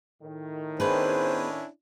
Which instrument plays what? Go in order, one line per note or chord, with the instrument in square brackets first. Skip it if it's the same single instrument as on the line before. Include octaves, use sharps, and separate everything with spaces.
[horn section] A2 D#3
[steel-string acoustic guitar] B3 G#4 B4 [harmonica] C#4 D4 E4 [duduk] C5